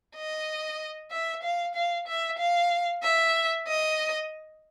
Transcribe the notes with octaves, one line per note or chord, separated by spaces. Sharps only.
D#5
E5
F5
F5
E5
F5
E5
D#5